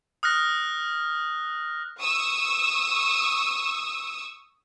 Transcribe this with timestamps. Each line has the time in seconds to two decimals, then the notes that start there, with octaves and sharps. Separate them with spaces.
0.23 D#6 F6 F#6 A#6
2.02 C#6 D#6 E6